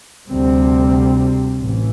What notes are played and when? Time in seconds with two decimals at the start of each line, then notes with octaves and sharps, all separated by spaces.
0.28 D2 C3 G3 C4
1.58 A1 A2 E3